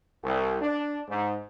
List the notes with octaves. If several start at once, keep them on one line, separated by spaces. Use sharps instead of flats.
C2
D4
G#2